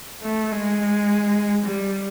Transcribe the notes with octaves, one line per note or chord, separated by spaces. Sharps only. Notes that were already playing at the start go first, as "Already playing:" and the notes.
A3
G#3
G3